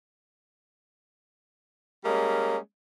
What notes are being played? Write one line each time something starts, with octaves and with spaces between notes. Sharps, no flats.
G3 G#3 A#3 C#4